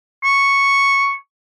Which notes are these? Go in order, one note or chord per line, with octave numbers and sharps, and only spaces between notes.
C#6